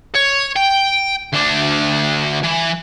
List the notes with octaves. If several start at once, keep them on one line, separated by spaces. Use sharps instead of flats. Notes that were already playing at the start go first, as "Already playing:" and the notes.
C#5
G5
D2 D4
E3